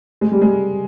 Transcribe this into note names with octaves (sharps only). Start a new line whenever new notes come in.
G#3
G3
G#3